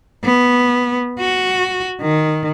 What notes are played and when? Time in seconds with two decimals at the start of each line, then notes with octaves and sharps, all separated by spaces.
0.24 B3
1.19 F#4
2.01 D#3